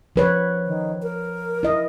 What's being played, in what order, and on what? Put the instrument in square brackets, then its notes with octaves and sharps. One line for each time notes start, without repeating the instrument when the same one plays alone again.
[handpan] F3 B4 C#5
[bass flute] D#3
A#4
[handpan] E4 D#5